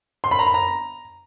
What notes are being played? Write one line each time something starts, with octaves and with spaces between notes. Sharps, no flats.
C6
B5
A#5
B5
A#5